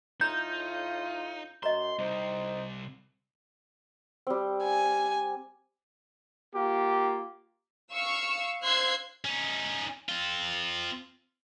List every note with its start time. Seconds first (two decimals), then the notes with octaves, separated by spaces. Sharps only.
0.21 A2 D#4 F4 A#5 G6
1.63 F#2 D#5 A#5 C6
1.99 C3 G3 D#4 C5
4.27 G3 C4
4.63 G#5
6.53 A#3 F4 G4
7.94 F5 C#6 E6
8.65 C5 F5 C6 E6 F#6 G#6
9.25 C#4 D#4
10.09 C4 F4